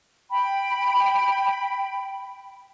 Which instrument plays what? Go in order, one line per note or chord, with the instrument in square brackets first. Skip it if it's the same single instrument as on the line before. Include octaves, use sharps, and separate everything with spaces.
[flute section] G5 B5